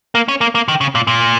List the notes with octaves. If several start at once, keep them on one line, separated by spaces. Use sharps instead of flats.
A#3
C#4
A#3
A#3
D#3
C#3
A#2
A#2